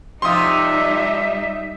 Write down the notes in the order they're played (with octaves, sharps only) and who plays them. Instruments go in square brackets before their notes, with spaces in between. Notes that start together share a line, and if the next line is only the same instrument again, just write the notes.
[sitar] C3 F3 F4 [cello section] G3 D#4 [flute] E5 [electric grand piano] C6 D#6